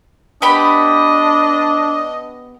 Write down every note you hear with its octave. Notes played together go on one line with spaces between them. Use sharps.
B3 D4 G4 D#5 B5